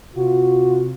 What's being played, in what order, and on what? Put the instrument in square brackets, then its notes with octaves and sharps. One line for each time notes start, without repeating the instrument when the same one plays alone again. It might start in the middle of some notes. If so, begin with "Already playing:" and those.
[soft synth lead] C3 [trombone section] F4 F#4